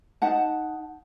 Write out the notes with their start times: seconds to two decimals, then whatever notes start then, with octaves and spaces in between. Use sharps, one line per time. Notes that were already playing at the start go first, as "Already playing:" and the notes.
0.22 D#4 F#5 A5